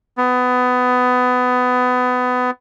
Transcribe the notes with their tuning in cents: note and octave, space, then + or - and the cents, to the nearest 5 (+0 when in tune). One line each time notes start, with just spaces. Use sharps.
B3 +20